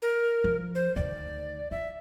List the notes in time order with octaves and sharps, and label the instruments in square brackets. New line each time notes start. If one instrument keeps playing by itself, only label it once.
[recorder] A#4
[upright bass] F3
[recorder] C5
[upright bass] D2 D#3 [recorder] D5
[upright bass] F4 [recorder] E5